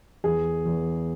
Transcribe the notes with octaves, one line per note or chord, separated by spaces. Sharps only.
E2 G#4
E2